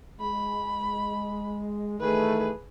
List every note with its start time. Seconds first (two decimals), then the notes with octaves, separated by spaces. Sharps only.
0.20 G#3 B5
2.00 D#3 E3 A3 G#4 B4